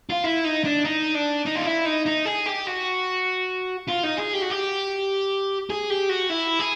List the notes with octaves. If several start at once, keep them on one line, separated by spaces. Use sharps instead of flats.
F4
E4
D#4
D4
D#4
D4
D#4
F4
E4
D#4
D#4
G#4
G4
F#4
F4
D#4
G#4
G4
F#4
G4
G#4
G4
F#4
E4
G#4